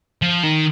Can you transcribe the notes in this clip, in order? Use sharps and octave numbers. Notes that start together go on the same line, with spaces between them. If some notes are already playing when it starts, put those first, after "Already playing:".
F3
D#3